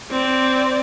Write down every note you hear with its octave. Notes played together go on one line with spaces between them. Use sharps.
C4 D5